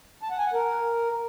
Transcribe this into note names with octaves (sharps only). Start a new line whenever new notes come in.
A5
F#5
G#5
F#5
A#4